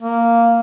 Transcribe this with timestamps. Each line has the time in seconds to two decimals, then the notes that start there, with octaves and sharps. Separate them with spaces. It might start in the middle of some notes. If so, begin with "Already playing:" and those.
0.01 A#3